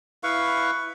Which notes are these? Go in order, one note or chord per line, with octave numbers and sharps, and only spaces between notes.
E4 B4 F5 C#6